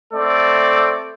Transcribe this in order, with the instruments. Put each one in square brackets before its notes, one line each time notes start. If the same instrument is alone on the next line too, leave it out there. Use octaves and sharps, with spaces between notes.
[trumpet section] A3 C4 A4 D5